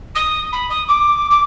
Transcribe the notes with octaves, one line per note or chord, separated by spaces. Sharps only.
D#6
B5
D#6
D6
D6